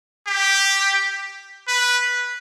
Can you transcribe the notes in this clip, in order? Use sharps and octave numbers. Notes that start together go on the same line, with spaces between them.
G4
B4